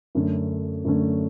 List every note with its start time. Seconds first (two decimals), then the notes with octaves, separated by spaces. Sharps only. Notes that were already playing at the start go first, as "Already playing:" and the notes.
0.15 F#2 D3 A3 C#4
0.85 F#2 D3 A3 C#4